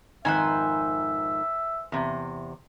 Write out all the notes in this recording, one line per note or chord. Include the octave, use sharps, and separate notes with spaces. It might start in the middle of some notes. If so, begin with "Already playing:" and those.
F2 G#2 D#3 B4 C5 E5 G#5
E2 C3